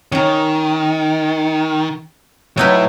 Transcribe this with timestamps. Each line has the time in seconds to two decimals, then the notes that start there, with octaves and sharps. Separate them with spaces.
0.12 D#3 C#4 A#5
2.57 A2 F#3 D#4 E4 B4